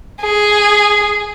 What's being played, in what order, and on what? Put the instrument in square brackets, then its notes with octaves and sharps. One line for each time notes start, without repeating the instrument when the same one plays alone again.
[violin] G#4